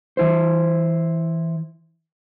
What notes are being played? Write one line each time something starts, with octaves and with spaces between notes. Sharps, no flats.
E3 E4 C5